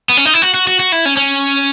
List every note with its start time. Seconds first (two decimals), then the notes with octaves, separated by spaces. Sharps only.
0.09 B3
0.17 C#4
0.26 D#4
0.34 E4
0.42 F#4
0.54 F#4
0.67 F#4
0.80 F#4
0.92 E4
1.06 C#4
1.17 C#4